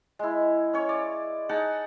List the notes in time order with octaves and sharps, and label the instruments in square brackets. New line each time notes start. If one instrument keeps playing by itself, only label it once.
[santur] G#3 E4
C#4 C#5
D5
D#4 G#4 F#5 A5